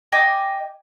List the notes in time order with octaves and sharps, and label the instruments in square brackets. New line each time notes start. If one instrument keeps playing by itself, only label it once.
[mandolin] D#5 G5 G#5 D6